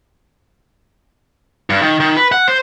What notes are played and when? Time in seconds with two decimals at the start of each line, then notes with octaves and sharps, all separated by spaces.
1.70 G2
1.82 D#3
2.00 D#3
2.17 B4
2.32 F#5
2.48 C5